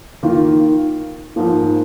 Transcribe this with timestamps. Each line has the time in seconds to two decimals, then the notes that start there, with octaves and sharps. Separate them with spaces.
0.23 D#3 A#3 F4
1.36 G#2 F3 A#3